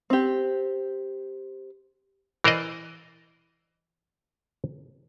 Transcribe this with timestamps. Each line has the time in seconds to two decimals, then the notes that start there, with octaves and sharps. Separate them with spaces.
0.10 C4 G4
2.44 E3 A#4 C5 D5 D#5